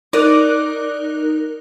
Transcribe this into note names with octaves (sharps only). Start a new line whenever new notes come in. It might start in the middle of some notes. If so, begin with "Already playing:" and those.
D#4 A#4 D5 F#6